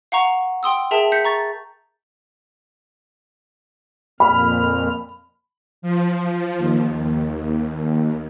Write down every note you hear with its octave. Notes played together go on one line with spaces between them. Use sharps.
F5 F#5 A#5 C#6 F7
G5 C6 D#6 E6
G#4 A#4 E5 G5 A5
G6 B6 C#7
A#5 C#6 A6
F2 A#2 B5 F6
F3
D#2